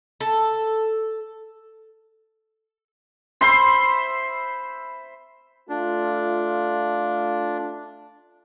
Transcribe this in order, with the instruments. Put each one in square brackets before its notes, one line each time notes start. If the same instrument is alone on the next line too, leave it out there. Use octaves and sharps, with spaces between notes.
[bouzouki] A4
[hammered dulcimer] C5 E5 B5 C6
[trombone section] A3 F4 [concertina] D4